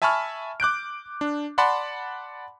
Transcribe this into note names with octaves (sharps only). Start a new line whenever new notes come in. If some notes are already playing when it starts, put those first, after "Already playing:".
E5 G#5 A5 B5 C#6 F6
D6 F#6 G6 D7
D4
D5 F#5 A5 B5 C6